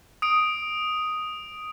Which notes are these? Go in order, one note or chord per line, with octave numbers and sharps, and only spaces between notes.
D#6 D7